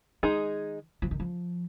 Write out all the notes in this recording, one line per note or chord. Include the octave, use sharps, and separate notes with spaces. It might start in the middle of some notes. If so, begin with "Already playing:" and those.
D#3 G#3 D#4 G#4
F3
D#3
F3